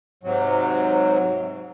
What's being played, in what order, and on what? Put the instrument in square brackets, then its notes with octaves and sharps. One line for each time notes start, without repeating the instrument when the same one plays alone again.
[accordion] G#2 C3 F#3